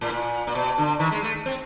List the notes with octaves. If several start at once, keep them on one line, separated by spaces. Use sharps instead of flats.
A2
A#2
A#2
B2
D3
D#3
G#3
A3
C4